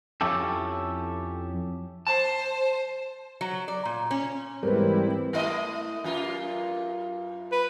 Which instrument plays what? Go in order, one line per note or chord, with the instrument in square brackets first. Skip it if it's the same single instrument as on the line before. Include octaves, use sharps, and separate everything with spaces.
[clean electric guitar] F2 C#4 E4 G4 A4
[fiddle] C5 [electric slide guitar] A5
[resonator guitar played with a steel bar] F#3
D5
A#2
C#4
[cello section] G#2 E3 E4 [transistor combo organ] G3 C4 [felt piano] A#4 B4
[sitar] A3 E4 D#5
F#2 A#3 F4
[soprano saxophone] B4